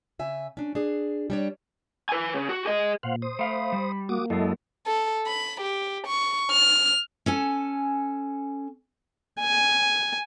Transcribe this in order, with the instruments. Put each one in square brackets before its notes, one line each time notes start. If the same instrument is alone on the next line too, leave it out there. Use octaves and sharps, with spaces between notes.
[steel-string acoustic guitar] C#3 E5 G#5
C#4 D4
D4 G#4
G3 D4 C#5
[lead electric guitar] B4 G#5
C#3
F#4
G#4 D#5
[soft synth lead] A#2 [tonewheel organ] C5 F5 F#5
[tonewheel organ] C5 D#6
[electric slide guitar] A3 F5 [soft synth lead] B5
[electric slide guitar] G3
[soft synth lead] A#3 [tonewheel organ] F#4 D6 D#6
[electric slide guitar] F#2 G#3 [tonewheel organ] E4 A4 D#5
[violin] A4
B5
G4
C#6
F6
[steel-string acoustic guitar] C#4 A4 G#5
[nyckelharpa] G#5